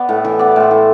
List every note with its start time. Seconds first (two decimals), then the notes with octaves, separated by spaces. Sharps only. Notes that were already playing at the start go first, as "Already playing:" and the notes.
Already playing: B3 D5
0.09 A2
0.25 E3
0.39 B3 D5
0.56 A2 C5
0.71 A2